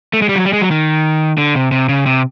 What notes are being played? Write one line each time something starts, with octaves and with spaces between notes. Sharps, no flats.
A3
G#3
G3
F#3
G3
G#3
F#3
D#3
D3
C3
C3
C#3
C3